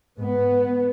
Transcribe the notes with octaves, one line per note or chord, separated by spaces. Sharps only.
G#2 B3